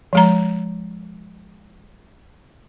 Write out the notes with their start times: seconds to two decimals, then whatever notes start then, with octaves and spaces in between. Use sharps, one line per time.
0.13 F3 G#3 A#5